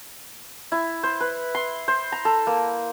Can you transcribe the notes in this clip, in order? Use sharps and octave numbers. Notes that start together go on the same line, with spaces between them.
E4
C5
B4
C6
C5
A#5
A4
A#3